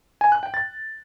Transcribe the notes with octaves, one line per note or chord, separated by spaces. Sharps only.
G#5
F#6
G5
A6